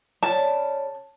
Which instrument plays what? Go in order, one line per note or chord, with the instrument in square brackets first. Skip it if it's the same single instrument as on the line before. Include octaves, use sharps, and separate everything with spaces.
[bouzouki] C#3 C#4 D5 [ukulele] A5